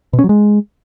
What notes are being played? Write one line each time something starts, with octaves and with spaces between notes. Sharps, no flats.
B2
C#4
F#3
G#3